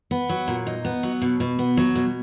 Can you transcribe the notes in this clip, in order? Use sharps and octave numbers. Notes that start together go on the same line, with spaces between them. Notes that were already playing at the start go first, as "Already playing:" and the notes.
B3
F#3
A#2
D#4
B3
F#3
B2
B2
B3
F#3
B2